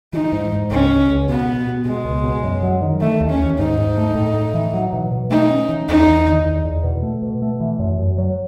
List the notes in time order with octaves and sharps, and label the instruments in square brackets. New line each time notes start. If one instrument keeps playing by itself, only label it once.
[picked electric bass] E3 [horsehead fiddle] D#4
[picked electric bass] G#2
G#2
[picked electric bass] C#2 [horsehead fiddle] C#4
[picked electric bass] C#2
C#2
[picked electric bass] B2 [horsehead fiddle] B3
[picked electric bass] B2
B2
[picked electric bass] B2 [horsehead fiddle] G#3
[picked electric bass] C#2
B2
F#2
F#3
D#3
[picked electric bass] E3 [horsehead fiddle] A3
[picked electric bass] D#2
[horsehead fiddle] C#4
[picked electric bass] D#2
[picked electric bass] G#2 [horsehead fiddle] D#4
[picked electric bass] G#2
A3
A2
A2
E3
F#3
B2
B2
[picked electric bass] A3 [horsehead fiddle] D#4
[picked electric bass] C#4
E3
[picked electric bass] E2 [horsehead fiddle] D#4
[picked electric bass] E2
D#3
E2
E2
B2
A3
B2
A3
E3
F#2
F#2
F#3